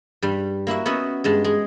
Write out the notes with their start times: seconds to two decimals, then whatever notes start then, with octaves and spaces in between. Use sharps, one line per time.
0.22 G2 G3
0.67 A#3 E4 F#4 E5
0.86 B3 C#4 F#4 C#5 D#5 E5
1.24 G2 G#3 A5
1.44 G#3 G#4